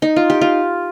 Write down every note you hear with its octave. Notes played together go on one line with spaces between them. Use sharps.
D#4
F4
G4
F4